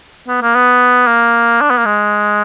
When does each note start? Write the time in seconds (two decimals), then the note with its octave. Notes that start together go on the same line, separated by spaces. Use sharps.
0.28 B3
0.42 A#3
0.55 B3
1.07 A#3
1.61 D4
1.70 B3
1.78 A#3
1.86 G#3